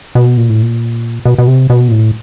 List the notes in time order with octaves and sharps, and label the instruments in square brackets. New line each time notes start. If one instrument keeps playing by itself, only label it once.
[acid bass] B2
A#2
A2
A#2
B2
B2
C3
B2
A#2
A2